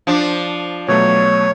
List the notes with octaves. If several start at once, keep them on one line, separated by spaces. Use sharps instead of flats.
F3 D4
B2 F#3 A3 C#5